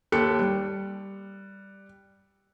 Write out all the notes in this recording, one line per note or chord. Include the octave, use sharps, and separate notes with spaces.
D#2 G4 A4 F#6 C#7
G3